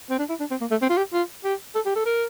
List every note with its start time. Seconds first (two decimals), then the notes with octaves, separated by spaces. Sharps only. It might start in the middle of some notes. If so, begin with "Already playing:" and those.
0.10 C4
0.19 D4
0.29 E4
0.40 D4
0.51 C4
0.61 A#3
0.71 A3
0.82 C4
0.89 F4
0.97 G4
1.13 F4
1.44 G4
1.75 A4
1.86 G4
1.96 A4
2.06 A#4